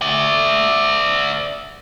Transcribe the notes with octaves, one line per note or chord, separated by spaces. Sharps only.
D5 E5